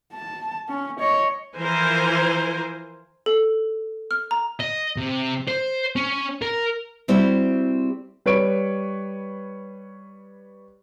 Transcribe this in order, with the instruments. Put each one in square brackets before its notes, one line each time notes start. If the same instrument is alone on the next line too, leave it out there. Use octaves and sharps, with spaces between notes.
[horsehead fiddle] A5
C#4
C#5 D#5
[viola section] E3 F3 A#4 C5 G#5
[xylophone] A4
F6
A#5
[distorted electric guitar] D#5
C3
C5
C#4
A#4
[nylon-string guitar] G3 C4 E4 F#4 G4
[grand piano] G3 B4 C#5 D7